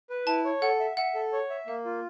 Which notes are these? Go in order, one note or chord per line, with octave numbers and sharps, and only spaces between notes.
B4
E4 A5
C#5
A4 F#5
E5
E5 F#5
A4
C#5
E5
A#3 F5
F4